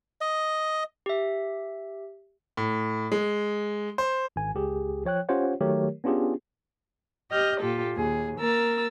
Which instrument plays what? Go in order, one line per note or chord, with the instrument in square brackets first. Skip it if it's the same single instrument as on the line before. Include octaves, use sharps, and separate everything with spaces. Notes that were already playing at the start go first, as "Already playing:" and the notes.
[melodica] D#5
[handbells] G4 E5
[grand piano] A2
G#3
C5
[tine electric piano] G#1 G#5
C#2 G4 G#4
F3 C#5 G5 F#6
C#4 F4 G4 C5 C#5 F#5
D#3 F#3 A3 G4 A#4 C#5
B3 C#4 D4 F4 G4 G#4
[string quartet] G4 D#5 F6 G6
A#2 F4 G4 A4
D#2 G#4
A#3 A#4 A#5 E6 A6